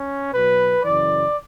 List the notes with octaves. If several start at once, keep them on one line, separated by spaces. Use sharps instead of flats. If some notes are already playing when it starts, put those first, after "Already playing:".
Already playing: C#4
B2 F#3 B4
F#2 C#3 E3 D5